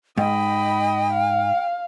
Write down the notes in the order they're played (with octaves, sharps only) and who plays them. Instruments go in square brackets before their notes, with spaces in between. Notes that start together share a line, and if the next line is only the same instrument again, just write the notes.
[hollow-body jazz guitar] G#2 [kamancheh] D#5 B5 [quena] G5
[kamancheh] F5